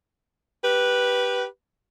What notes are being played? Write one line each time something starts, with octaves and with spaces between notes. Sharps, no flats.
G4 B4